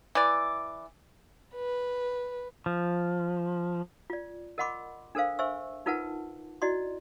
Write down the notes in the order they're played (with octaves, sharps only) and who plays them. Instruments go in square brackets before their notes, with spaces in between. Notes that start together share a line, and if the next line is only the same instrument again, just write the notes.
[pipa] E3 D5
[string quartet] B4
[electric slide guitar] F3
[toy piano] F4 D5
A#4 D#5 F#5 B5 C6 D6
D4 A4 A#4 C5 F5
C5 E5 G#5 C#6 E6
D#4 F4 A#4 B4 F#5 A5
E4 F#4 D5 D#5 C6